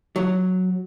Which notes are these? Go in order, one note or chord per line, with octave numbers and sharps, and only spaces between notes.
F#3